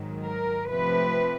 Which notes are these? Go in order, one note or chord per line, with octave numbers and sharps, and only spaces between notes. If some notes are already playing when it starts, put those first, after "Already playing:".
Already playing: G#2 D#3 F#3
A#4
C3 F3 A3 C4 B4